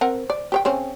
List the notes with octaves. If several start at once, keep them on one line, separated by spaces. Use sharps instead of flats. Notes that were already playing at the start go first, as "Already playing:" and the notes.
C4 A#4 F#5
D5
G4 C#5 G5
C#3 C4 C#4